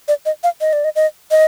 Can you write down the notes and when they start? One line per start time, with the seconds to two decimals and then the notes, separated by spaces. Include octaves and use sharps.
0.08 D5
0.26 D#5
0.43 F5
0.61 D#5
0.73 D5
0.84 D#5
0.96 D#5
1.31 D#5